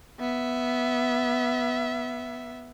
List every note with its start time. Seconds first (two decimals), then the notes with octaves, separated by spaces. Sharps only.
0.20 B3 E5